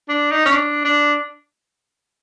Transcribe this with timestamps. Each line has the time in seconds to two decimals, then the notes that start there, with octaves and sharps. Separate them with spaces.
0.09 D4
0.31 D#4
0.45 C#4
0.53 D4
0.85 D4